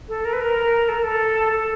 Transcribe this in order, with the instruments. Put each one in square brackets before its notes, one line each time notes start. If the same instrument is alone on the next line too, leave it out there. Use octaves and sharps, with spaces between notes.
[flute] A4
A#4
B4
A#4
A4
A#4
A4
A4